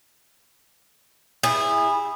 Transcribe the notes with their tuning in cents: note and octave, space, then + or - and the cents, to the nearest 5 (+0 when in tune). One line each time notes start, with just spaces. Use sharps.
E4 -10 G#4 -25